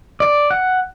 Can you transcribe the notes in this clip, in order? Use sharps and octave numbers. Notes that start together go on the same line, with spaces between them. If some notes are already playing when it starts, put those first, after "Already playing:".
D5
F#5